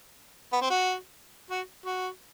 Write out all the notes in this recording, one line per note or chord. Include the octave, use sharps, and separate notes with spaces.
B3
C4
F#4
F#4
F#4